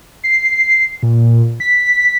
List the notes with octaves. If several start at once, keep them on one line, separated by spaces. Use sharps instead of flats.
C7
A#2
B6